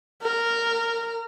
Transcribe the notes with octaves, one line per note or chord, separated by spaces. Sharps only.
A#4